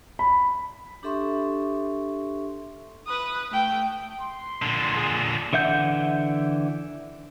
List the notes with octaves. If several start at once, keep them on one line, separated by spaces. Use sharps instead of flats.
B5
D4 G4 A4 E5 C6 C#6
B4 D#6
A3 G5
C6
A#2 D3
G#4
D3 E3 E5 F#5 G6